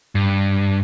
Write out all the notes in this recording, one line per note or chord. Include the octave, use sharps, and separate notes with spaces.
G2